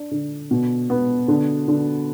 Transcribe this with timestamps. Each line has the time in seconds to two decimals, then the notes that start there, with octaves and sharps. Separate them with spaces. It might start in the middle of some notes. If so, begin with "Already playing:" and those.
Already playing: D4
0.11 D3
0.51 B2
0.90 B3
1.28 D3
1.68 D3